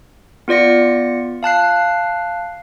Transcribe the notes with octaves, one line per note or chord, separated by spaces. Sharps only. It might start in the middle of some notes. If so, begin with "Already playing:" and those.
B3 F4 D5 A#6 C#7
F5 A5 F#6 C7